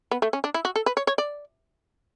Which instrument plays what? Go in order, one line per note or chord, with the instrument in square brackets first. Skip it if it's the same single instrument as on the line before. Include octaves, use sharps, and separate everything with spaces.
[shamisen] B3
A3
C#4
D4
E4
F#4
A4
B4
C#5
C#5
D5